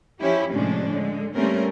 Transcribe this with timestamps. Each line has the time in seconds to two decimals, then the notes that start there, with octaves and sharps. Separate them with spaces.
0.21 F3 C#4 E4 G4
0.52 A2 C3 F3 G#3 C#4 D4
0.91 D3 G#3
1.35 G3 A3 A#3 C4 C#4 A#4